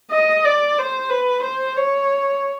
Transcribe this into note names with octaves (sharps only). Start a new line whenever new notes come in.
D#5
D5
C5
B4
C5
C#5